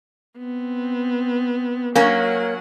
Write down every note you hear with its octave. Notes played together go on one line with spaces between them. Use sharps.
B3 C4
F#3 A#3 C#4 F#5